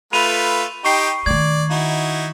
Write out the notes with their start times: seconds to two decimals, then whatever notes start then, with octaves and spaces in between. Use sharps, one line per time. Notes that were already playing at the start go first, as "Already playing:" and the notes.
0.13 A3 F4 B4 B5 D#7 F7
0.85 D#4 G4 G5 C#6 C7
1.26 D#3 A3 D5 G#6
1.70 D#4 E4 F#4